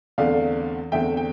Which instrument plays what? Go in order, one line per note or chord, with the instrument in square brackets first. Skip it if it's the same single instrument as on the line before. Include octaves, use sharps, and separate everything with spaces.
[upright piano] E2 D3 A3 C4 D5 F5
E2 D3 A3 C4 E5 G5
G5